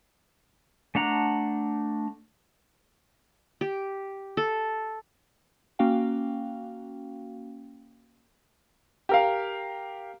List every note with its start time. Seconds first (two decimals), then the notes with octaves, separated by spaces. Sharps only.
0.95 A3 D4 F#5 A#5
3.61 G4
4.37 A4
5.79 A#3 C#4 F#4 F5 G5
9.09 G4 A#4 F5